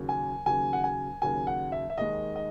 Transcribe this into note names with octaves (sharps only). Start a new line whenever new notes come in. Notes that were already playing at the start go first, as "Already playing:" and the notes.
Already playing: D#2 C#3 F#3
G#5
D#2 C#3 F#3 G#5
F#5
G#5
D#2 C#3 F#3 G#5
F#5
E5
E5
D#2 D#3 G#3 D#5
D#5